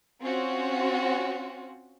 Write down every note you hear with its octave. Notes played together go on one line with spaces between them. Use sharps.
C4 C#4 F4 F#4